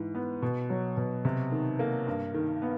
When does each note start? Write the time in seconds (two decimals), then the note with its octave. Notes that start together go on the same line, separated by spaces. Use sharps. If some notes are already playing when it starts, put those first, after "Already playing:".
Already playing: G#2 E3
0.15 B3
0.42 B2
0.70 F#3
0.97 B2
1.25 C3
1.52 D#3
1.79 A#3
2.07 G2
2.34 D#3
2.62 B3